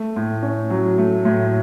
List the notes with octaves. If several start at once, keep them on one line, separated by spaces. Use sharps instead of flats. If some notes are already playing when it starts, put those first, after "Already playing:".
Already playing: A3
A2
C#4
F#3
A3
A2